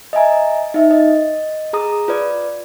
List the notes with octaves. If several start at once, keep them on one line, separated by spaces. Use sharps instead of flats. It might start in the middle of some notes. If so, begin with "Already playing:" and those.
D#5 E5 G#5 A#5
D#4 E5
D#5
G#4 A#5 D#6
F4 B4 D5